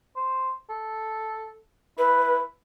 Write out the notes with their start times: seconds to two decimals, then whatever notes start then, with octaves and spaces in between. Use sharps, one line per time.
0.16 C5
0.70 A4
1.98 E4 B4